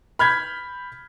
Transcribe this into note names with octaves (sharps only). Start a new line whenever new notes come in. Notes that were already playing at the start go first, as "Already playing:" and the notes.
B5 F6 G6 G#6 B6